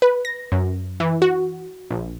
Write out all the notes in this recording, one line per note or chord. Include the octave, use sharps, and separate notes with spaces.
B4
A#6
F#2
E3
F#4
A#1